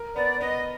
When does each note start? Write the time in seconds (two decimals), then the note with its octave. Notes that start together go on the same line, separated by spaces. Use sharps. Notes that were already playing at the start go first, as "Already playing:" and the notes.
Already playing: A#4
0.16 B3 D5
0.40 B3 D#5